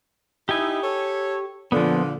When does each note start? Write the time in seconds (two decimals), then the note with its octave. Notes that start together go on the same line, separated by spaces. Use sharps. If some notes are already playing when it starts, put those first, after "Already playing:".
0.49 D#4 E4 G4 G#5
0.83 A4 C#5
1.72 A#2 D3 F3 B3